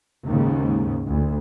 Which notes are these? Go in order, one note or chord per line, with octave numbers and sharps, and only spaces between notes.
D#2 G#2 C#3
D2